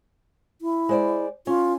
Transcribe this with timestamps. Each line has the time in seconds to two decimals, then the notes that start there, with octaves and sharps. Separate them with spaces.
0.61 E4
0.89 G#3 C5 D5
1.47 C#4 F4